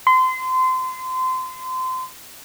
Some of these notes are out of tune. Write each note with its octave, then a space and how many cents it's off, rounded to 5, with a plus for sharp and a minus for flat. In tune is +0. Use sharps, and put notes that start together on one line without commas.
C6 -30